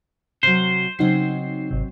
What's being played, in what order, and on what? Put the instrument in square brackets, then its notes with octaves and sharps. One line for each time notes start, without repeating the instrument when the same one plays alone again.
[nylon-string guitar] C3 F#3 [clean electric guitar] C5
[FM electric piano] C#3 D#4 C7 [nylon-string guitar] F#3 C4 D#5
[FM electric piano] G#1 C3